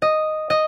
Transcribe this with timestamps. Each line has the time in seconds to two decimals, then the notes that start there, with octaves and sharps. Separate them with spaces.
0.02 D#5
0.50 D#5